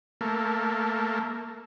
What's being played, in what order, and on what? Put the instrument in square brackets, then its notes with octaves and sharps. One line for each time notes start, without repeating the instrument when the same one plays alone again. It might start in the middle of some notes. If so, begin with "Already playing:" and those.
[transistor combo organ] A3 A#3